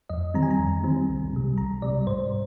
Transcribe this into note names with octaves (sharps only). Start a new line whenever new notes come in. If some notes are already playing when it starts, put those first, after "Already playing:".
F2 D#5
D#3 G3 C4 A#5
G#5
A#5
F2
D#3 G3 C4
C2
C3 G3
C2 A#5
C3 G3 D5
G#2 C5